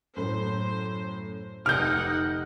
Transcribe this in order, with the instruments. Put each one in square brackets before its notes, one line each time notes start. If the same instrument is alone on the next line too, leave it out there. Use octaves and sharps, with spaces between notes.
[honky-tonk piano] F#2 A2 [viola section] C5
[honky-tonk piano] F1 D#6 D7 [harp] C3 [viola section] D#4 F#5 [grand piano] F6 G6